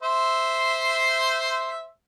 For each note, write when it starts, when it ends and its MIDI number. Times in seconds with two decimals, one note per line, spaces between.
0.03 1.87 72
0.03 1.87 76
0.03 1.87 84